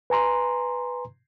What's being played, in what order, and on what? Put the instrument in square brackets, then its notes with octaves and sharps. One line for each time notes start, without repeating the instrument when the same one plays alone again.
[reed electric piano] B4 G#5 A#5 C6